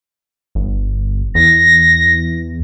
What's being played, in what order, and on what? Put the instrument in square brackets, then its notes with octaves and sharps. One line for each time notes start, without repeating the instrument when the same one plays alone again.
[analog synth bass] G1
[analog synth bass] E2 [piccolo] A#6